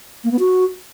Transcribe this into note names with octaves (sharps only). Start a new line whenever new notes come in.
A#3
B3
F#4